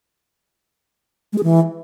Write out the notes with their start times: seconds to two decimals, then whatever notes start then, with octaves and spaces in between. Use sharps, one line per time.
1.33 G#3
1.38 G#4
1.43 E3